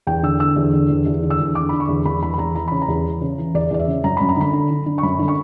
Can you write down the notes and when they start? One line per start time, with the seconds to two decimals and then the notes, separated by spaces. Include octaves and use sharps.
0.07 E2 G5
0.23 D3 E6
0.40 D3 E6
0.56 E2
0.73 D3
0.89 E2
1.06 E2
1.23 D3
1.30 E6
1.40 E2
1.55 D3 D6
1.69 D3 B5
1.80 C#6
1.89 E2
2.05 E2 B5
2.22 E2 B5
2.34 B5
2.38 E2 A#5
2.55 E3 A#5
2.68 C#3 B5
2.82 A#5
2.88 E2
3.05 E3
3.21 C#3
3.38 E3
3.54 E2 D5
3.71 E2 D5
3.79 E5
3.87 C#3
4.04 F#2 A#5
4.17 F#2 B5
4.29 A#5
4.37 D3 B5
4.53 D3
4.71 D3
4.86 D3
4.98 C#6
5.03 F#2 B5
5.19 D3
5.28 C#6